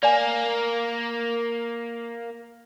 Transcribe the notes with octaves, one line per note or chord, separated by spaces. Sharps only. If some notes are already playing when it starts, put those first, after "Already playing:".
A#3 D5 G#5